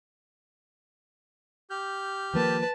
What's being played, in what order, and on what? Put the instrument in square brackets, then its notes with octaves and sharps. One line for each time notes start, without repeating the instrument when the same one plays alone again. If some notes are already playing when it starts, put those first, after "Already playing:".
[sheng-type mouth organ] G4 F6 G6
[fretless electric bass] D#3 F3 A#3 [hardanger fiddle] B4 A5